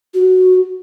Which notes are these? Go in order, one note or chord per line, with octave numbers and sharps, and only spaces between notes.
F#4